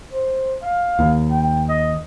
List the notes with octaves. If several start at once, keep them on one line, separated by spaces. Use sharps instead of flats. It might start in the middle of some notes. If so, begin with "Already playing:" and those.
C5
F5
D#2
G5
D#5